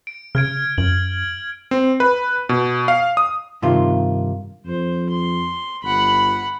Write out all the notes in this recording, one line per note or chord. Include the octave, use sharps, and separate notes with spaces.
D7
C#3 F6 G#6 D7
F#2 F#7
C4
B4
B2
F5
D#6
G2 C3 D#3 F4
F2 C5
C6
G1 F#5 B5